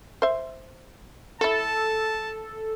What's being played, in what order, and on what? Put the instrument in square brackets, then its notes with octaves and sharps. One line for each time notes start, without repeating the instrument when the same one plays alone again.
[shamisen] C5 E5
[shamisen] A3 E4 [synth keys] A4 [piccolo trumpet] A5